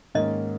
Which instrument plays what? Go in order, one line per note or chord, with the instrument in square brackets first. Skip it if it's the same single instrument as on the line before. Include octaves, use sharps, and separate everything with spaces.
[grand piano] G#2 D#3 A#3 C#4 [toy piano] D#5